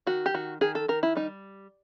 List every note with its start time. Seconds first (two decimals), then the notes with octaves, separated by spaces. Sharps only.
0.07 D#3 F#4
0.26 G4
0.34 D#3 F#4
0.61 D#3 G#4
0.75 A4
0.88 D#3 A#4
1.03 E4
1.15 G3 D#4